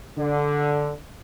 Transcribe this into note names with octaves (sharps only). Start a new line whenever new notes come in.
D3